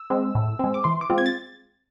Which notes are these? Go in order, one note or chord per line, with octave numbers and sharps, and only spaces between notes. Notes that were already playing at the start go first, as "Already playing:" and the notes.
Already playing: E6
G#3 C4
A2
G#3 C4
D6
E3 C6
D6
G#3 C4 F4
G#6
A6